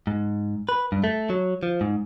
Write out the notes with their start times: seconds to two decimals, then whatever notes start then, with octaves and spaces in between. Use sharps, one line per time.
0.07 G#2
0.69 B4
0.92 G2
1.04 A3
1.30 F#3
1.63 F3
1.81 G#2